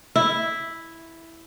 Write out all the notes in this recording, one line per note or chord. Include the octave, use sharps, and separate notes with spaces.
E4